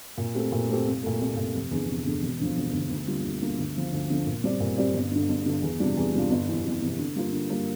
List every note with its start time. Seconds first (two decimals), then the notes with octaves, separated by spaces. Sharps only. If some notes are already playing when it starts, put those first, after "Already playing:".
0.17 A#2
0.35 A3 C4 G4
0.52 A#2
0.69 A3 C4 G4
0.87 C2
1.03 A#2 A3
1.20 C2
1.37 A#2 A3
1.54 F1
1.71 E2 D3
1.88 F1
2.05 E2 D3
2.23 E1
2.39 D2 D3 F3
2.57 E1
2.73 D2 D3 F3
2.90 D2
3.07 D3 G3 A#3 F4
3.25 D2
3.41 D3 G3 A#3 F4
3.58 D2
3.75 D3 F3
3.93 D2
4.10 D3 F3
4.26 A#2
4.43 G3 C4 G4 D5
4.60 A#2
4.78 G3 C4 G4 D5
4.95 G1
5.11 G2 D3
5.29 G1
5.46 G2 D3
5.62 E2
5.80 C3 G3 D4 F4
5.97 E2
6.14 C3 G3 D4 F4
6.31 G1
6.48 F2 C3 E3
6.65 G1
6.82 F2 C3 E3
6.99 D3
7.16 G3 A#3 F4 A#4
7.33 D3
7.50 G3 A#3 F4 A#4